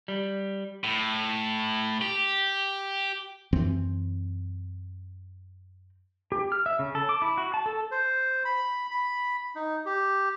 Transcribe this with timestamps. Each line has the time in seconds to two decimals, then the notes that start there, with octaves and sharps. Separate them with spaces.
0.08 G3
0.84 A2
2.02 G4
3.53 F#2 E3 C4
6.32 G4
6.52 F6
6.66 E5
6.79 C#3
6.95 A4
7.09 D6
7.22 E4
7.38 F#4
7.54 A5
7.66 A4
7.91 C5
8.45 B5
8.91 B5
9.55 D#4
9.86 G4